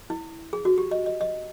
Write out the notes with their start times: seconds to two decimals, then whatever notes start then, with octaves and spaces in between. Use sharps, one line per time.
0.10 E4
0.53 G#4
0.65 F#4
0.78 G4
0.91 D#5
1.06 D#5
1.21 D#5